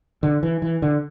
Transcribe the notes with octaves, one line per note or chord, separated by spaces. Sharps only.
D3
E3
E3
D3